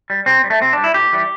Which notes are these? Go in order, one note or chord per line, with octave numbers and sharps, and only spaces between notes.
G3
C3 C4
G3
A3
C3 C4
G3 D4
E4
A2 G4
E3 G3